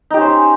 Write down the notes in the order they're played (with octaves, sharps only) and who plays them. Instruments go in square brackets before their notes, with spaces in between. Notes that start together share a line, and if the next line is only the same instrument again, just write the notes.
[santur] D#4
G4
C#4
C5